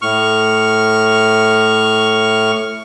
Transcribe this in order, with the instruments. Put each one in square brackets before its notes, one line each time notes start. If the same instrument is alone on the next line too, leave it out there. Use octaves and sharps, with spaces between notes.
[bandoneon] A2 C#6 F6